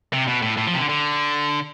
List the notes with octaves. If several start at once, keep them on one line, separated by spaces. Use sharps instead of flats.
C3
B2
A2
A2
F3
C3
D3
D3